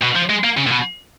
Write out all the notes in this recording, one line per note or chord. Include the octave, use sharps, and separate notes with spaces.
B2
F3
G#3
A#3
C#3
A#2
B2